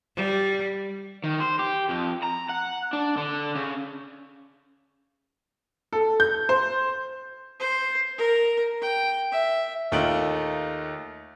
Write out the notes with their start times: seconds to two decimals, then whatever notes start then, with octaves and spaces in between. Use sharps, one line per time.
0.16 G3
1.24 D#3
1.40 C5
1.59 G4
1.89 F2
2.23 A#5
2.49 F#5
2.93 D4
3.17 D3
3.55 C#3
5.93 A4
6.20 G6
6.49 C5
7.60 C5
8.18 A#4
8.82 G5
9.32 E5
9.92 D#2 A3 D#4 F4 D7 F#7